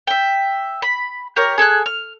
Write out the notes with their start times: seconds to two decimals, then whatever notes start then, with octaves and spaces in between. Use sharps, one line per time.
0.07 E5 G5
0.82 B5
1.36 G4 A#4 C#5
1.58 G#4 A4 G#5 F#6
1.86 F6